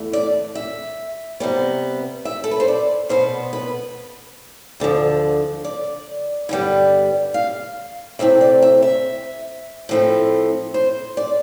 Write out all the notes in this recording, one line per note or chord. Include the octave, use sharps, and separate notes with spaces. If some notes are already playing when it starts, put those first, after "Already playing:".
Already playing: E2 A3
D5
E5
C3 G3 B3
E5
A4
B4
C5
D5
B2 B3 C5
B4
D2 D3 F3
D5
G2 D3 G3 B3
F5
C3 E3 A3 C4 E5
D5
E5
E5
A2 F3 A3 C4
C5
D5